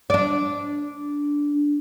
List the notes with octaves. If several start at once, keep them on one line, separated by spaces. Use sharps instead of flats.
D4 D5